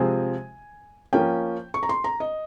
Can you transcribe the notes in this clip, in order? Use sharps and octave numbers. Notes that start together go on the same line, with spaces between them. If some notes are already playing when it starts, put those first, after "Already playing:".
Already playing: C3 F3 G#3 C4 G#5
F3 A#3 C#4 G5
C#6
A#5
C6
A#5
D#5